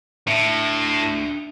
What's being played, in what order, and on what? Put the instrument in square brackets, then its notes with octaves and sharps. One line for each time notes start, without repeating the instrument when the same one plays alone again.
[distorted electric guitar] A2 [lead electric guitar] D4 E5